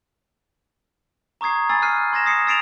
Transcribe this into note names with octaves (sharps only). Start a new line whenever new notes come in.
A#5 C#6 D#6 G#6 C7
G#5 B5 E6 A6 C7
F6 F#6 C7 D#7
C6 G#6 A#6 E7
D#6 C7 C#7
E6 A6 C7 D7 E7 F7